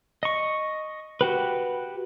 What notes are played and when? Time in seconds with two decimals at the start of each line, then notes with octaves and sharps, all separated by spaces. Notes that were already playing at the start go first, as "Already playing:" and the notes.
0.23 D#5 C#6
1.21 F#4 G4 B4